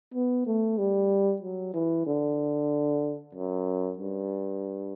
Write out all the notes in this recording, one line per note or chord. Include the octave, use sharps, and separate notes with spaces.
B3
A3
G3
F#3
E3
D3
F#2
G2